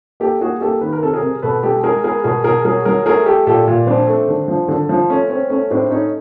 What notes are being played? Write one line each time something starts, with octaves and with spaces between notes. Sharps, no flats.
A#3 G4 A4
A#3 F#4 G#4
A#3 G4 A4
D#3 B4
A#4
C3 A4
G#4 A#4
C3
B2 A4 B4
G#3 G4 A4
G#3 G#4 A#4
B3 G#4 A#4
B2 G#4 A#4
B2 G#4 A#4
F#3 G#4 A#4
F#3 G#4 A#4
A3 G#4 A#4
A3 G4 A4
A#2 G4 A4
A#2
F3 C4 D4
A3
D3
F3
D3
F3
A3 C#4
C4 C#4
A3 C#4
A2 C4 D4
A3 C#4 D#4